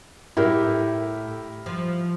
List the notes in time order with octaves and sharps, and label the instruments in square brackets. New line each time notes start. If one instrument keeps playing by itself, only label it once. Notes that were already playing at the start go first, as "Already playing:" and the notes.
[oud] A2 [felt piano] E4 G4 A#4
[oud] F3